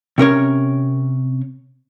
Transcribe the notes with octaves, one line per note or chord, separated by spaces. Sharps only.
C3 C#4 A#4 C#5